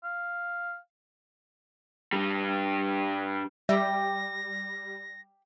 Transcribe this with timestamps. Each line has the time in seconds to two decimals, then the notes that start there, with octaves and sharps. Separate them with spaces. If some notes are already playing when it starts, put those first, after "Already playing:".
0.04 F5
2.13 G2 G3
3.69 G3 G4 E5 G5 A#6